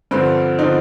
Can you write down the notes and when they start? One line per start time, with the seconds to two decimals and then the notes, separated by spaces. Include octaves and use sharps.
0.11 G2 D3 F3 C4
0.59 D3 F3 C4 D#4